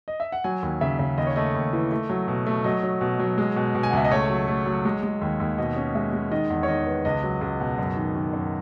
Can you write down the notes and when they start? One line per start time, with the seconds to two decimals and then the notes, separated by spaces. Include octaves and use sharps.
0.08 D#5
0.20 E5
0.32 F#5
0.44 F#3 G#5
0.62 D#2
0.81 C#3 E5
0.99 C#3
1.18 D#2 D#5
1.27 C#5
1.36 A3 D#5
1.55 D#2
1.73 E3
1.92 A3
2.10 F#3
2.28 B2
2.47 A3
2.64 F#3 D#5
2.83 F#3
3.01 B2
3.20 F#3
3.38 G#3
3.56 B2
3.75 B2
3.83 G#5
3.90 F#5
3.93 C#2 E5
4.04 D#5
4.11 A3 C#5
4.30 F#3
4.48 A3
4.66 F#3
4.85 G#3
5.03 G#3
5.21 D#2
5.40 D#2
5.58 B2 D#5
5.76 C#4
5.95 G#3 E5
6.13 G#3
6.31 D#3 D#5
6.50 E2
6.63 C#5
6.68 D#3 D#5
6.87 B3
7.05 C#2 D#5
7.23 F#3
7.41 C#2
7.60 B2
7.78 F#2
7.97 D#3
8.15 D#3
8.33 F#2